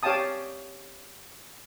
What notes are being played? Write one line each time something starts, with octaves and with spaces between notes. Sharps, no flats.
G4 C#5 F5 G5 A5 D#6